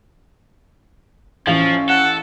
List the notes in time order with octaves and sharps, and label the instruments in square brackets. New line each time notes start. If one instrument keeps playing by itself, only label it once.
[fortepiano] A1 F5 [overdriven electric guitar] F3 [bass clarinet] C#4
[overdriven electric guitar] A4 [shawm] F#5